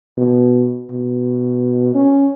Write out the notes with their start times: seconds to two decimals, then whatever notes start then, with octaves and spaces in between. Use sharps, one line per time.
0.17 B2
0.91 B2
1.95 C#4